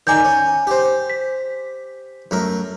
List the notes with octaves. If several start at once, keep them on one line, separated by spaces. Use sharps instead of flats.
D#3 D5 G#5 A#5 G6
C#4
G4 C5
B6
F#2 A3 A#4